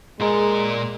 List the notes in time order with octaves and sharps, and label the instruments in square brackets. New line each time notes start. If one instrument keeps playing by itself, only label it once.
[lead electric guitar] A#2 A#4 [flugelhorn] G#3